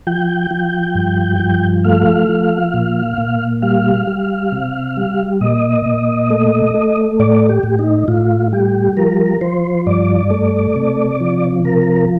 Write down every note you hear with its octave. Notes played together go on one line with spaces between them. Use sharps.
F3 G5
F3
G2
F3
A3 F5
F3
A#2
A#2
G3 F5
G3
C3
G3
A#2 D#5
A#2
A3
A3
A2 D5
G4
A2
D#4
A2 F4
G3 G4
F3 A#4
F3 C5
G2 D5
A3
C3
F3
C3 A#4